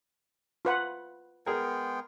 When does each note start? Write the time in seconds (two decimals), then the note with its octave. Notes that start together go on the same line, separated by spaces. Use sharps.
0.65 F4 B4 F#5
1.46 G#3 B3 G#4 A#4 G5